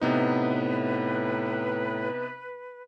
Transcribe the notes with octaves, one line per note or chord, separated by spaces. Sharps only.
A2 C3 B3 D#4 B4